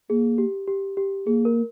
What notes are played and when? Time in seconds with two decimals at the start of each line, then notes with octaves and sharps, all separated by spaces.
0.10 A#3 G#4
0.38 G4
0.68 G4
0.97 G4
1.26 A#3 G#4
1.45 A#4